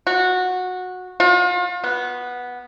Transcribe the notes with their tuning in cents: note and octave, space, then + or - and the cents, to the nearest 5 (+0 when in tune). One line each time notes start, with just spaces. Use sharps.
F#4 -15
F4 +40
B3 -5